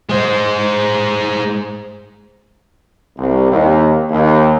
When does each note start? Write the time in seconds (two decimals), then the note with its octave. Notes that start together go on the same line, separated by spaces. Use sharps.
0.10 G#3 C5
3.18 C2
3.51 D#2
4.11 D#2